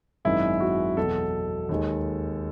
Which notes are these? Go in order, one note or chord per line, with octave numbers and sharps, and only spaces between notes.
G#1 F#2 D#3 G#3 E4
F#4
E2 B2 F#3 A4
D#2 D#3 G#3